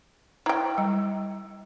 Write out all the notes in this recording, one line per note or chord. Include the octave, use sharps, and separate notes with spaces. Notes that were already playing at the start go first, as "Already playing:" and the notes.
E4 G5 A#5
G3